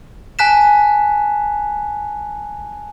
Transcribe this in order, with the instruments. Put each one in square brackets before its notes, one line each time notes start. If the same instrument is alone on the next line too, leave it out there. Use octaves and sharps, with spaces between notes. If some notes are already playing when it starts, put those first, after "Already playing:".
[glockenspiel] G#5 A5 F#6 B6 E7